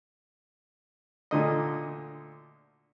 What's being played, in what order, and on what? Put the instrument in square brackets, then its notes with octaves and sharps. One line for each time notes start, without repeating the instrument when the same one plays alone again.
[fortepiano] D2 A#2 D3 D#5